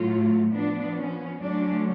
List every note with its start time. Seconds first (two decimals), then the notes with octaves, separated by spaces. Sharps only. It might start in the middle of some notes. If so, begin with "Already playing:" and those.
Already playing: A2 F#3 A3 F4
0.54 F3 B3 D4
0.97 C#4
1.39 D3 F#3 A3 C#4 D4